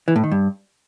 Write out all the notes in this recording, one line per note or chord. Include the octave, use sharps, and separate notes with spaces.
E3
A2
D#3
G2